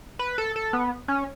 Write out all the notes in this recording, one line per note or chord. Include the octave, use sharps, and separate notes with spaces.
B4
A4
A4
B3
C#4